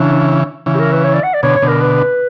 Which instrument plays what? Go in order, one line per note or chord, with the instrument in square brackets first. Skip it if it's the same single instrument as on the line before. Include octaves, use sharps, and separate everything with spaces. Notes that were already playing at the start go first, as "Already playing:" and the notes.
Already playing: [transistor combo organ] C#3 E3 [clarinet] D4
[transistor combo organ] C#3 E3
[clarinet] G4
A#4
B4
C#5
D5
F#5
D5
[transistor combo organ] B2 D3 [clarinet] C#5
[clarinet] C#5
[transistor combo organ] B2 D3
[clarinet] A#4
B4